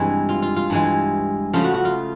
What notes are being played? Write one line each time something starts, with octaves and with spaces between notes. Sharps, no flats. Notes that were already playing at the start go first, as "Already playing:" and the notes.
Already playing: G2 C3 E3 G#3 E4
F4
F4
F4
G2 E3 G#3
C#3 F3 A3 F4
F#4
F#4
F4